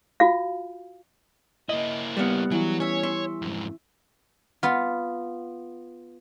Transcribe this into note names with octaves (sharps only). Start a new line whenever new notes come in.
F4 F#4 F5
A#3 E4 D#5
G3 B3 F5 F#5
E3 F#3 F#4
C#4 C#5 E5
E5 C6 C#6
F2 G#2
B3 F4